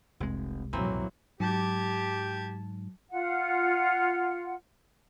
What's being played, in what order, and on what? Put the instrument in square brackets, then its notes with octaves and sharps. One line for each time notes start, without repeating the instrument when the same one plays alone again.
[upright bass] F1 [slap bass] C2 G#3
[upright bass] B1 F2 [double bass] A2 F#3 [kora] E3 A#3 C4
[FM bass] G#2 [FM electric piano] F#3 [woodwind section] G4 [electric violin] A5 G#6
[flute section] F4 F#5